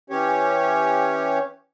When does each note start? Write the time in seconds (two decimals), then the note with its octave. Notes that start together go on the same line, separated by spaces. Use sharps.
0.10 E3 C#4 G4 C#5